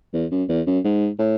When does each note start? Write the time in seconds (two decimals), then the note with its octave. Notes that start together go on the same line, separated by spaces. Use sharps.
0.13 E2
0.31 F#2
0.49 E2
0.66 F#2
0.84 G#2
1.19 A2